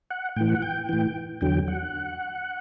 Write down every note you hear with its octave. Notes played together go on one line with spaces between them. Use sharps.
F#5
A2 E3 G5
F#5
G5
A2 E3
E2 D3 F#3 G5
F#5